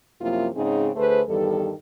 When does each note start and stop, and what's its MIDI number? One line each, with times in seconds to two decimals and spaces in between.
0.21 0.49 42
0.21 0.49 48
0.21 0.49 53
0.21 0.49 58
0.21 0.49 64
0.21 0.49 65
0.55 0.90 44
0.55 0.90 49
0.55 0.90 60
0.55 0.90 61
0.55 0.90 63
0.55 0.90 68
0.96 1.21 38
0.96 1.21 57
0.96 1.21 68
0.96 1.21 71
0.96 1.21 72
1.28 1.72 40
1.28 1.72 43
1.28 1.72 51
1.28 1.72 55
1.28 1.72 69